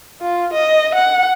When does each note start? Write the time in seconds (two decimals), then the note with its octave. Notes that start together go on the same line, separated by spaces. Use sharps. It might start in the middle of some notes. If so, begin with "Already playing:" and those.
0.21 F4
0.53 D#5
0.95 F#5